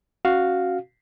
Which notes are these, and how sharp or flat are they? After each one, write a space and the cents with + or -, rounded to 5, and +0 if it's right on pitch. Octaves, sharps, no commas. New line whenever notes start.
C#4 -15 F#4 +0 F5 +0